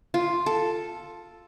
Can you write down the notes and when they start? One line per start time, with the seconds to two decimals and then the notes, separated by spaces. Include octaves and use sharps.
0.14 F4
0.46 A4